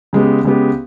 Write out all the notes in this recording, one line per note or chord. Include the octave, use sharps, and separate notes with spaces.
C#3 G#3 B3 G4
C#3 G#3 B3 G4